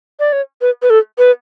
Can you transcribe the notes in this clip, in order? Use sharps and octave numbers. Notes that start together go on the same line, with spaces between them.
D5
C#5
B4
B4
A4
B4